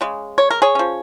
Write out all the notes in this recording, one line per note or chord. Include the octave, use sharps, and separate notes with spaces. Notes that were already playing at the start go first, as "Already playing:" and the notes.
C#3 G#3
C#5
A#4
G#4 C#5
F3 C#4